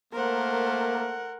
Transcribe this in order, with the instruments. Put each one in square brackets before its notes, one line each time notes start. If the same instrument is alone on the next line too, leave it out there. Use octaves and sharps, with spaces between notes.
[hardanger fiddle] A3 C5 [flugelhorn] A#3 [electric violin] A#4 F#5